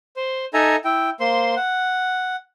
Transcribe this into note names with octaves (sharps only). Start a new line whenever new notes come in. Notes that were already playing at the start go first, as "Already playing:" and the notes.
C5
D#4 A4 E5 G#5 A#5
E4 G5
A#3 C5 C6
F#5